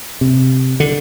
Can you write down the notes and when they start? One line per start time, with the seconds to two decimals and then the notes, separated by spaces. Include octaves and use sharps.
0.21 C3
0.80 D3